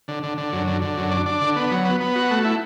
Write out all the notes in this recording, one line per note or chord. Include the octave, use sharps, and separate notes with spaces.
D3
D3
D3
F#2
D3
D3
F#2
D4
D4
D3
B3
F#3
B3
B3
F#4
A3
E4